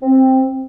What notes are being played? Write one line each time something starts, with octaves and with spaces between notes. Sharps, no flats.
C4